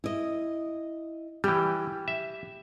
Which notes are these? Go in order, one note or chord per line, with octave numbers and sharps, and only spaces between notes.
E4 D#5
E3 G3 G4
E5